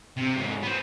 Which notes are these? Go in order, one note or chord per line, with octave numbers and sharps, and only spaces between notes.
C3
G#2 F#3
B3 C5